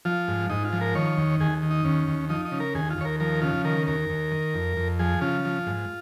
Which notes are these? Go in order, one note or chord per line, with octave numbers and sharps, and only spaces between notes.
F3 F4
G#2
G#2 D#4
F4
F3
A#4
D#3 C#5
D#2
D#2 G#4
D#3
D#4
D#2 C#4
D#2
F3 D#4
D#4
C#3
A#4
D#2 G#4
F4
D#2 C#5
A#4
F3 A#4
C#3 F4
D#3 A#4
D#2 A#4
D#2
D#3
F2
F2
F3 G#4
C#3 F4
F3
G#2